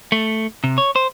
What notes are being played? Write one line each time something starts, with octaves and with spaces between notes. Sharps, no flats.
A3
C3
C#5
C5